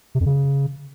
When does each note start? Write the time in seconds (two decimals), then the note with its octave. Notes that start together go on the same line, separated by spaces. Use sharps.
0.15 C3
0.20 F2
0.26 C#3